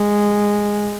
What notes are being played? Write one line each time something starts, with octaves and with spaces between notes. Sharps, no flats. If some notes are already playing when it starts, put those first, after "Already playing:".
Already playing: G#3